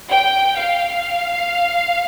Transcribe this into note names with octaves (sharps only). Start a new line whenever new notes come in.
G5
F5